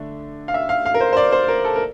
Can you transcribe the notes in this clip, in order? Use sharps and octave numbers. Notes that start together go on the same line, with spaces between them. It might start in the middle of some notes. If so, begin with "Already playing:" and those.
Already playing: D3 A3 D4
F5
E5
F5
F5
A#4
C5
C5
D5
C5
A#4
A4
A#4